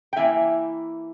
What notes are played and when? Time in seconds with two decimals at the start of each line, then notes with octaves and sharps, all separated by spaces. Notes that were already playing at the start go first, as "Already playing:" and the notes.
0.13 G5
0.16 E3 A#3 E4 E5 G#5